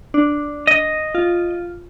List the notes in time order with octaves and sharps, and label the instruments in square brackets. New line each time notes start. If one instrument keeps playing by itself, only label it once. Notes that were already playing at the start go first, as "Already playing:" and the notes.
[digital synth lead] D4
[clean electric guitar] D#5
[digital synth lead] F4